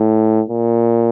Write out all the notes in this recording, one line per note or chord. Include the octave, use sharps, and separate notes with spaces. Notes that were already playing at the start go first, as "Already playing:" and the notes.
Already playing: A2
A#2